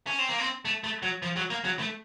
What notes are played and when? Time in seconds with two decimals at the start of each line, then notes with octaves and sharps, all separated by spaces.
0.07 C#4
0.19 C4
0.29 A#3
0.39 C4
0.65 A3
0.84 A3
1.03 F#3
1.23 F3
1.37 F#3
1.50 A#3
1.65 F#3
1.79 A3